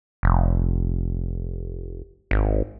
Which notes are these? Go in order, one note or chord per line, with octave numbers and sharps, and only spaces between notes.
F1
G#1